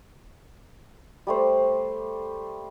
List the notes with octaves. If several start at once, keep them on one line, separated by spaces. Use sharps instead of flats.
G3 A3 C5